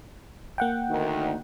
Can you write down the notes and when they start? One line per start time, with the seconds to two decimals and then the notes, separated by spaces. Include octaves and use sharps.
0.58 A#3 F#5 G5
0.90 D2 D#3